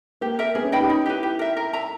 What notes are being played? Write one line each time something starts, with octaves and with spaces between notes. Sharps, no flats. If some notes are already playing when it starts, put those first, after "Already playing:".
A#3 G4
A#4 E5
B3 G#4
C#4
D#4 D#5 G5 B5
G4
D#4
E4 G4 B4
G4
A#4 E5
A#4
E5 A#5